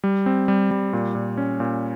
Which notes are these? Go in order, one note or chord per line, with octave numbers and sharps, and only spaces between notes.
G3
C4
G3
G3
A#2
A#2
C#4
A#2